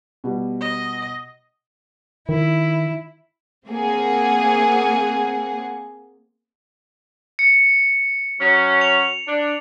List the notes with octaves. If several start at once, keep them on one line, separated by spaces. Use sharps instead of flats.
B2 G3
D#5
D#3 E4
A#3 C4 G#4 F#5
C#7
F#3 C#4
F7
D4